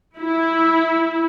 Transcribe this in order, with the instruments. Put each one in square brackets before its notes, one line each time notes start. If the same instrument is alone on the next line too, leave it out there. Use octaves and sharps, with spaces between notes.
[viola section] E4